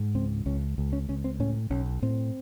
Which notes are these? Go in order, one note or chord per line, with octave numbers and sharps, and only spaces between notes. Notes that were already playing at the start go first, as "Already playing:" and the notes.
Already playing: G#2
C#2 C4
C#2 C#4
C#2
C#4
C#2 C#4
C4
A2 C#4
B1 C#4
A2 C4